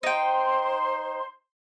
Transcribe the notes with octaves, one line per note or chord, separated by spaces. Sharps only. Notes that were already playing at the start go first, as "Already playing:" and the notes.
D#4 C5 G5 C6